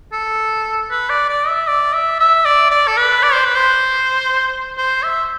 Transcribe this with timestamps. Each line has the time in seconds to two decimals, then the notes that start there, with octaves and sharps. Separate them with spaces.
0.13 A4
0.90 B4
1.10 D5
1.29 D5
1.48 E5
1.68 D5
1.94 E5
2.20 E5
2.45 D5
2.71 D5
2.87 A4
2.97 B4
3.23 D5
3.33 C5
3.45 B4
3.55 C5
4.78 C5
5.03 E5